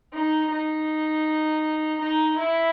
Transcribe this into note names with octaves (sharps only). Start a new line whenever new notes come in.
D#4
D#4
D#4
E4